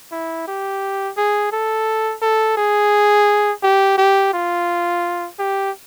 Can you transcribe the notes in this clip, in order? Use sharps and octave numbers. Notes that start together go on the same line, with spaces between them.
E4
G4
G#4
A4
A4
G#4
G4
G4
F4
G4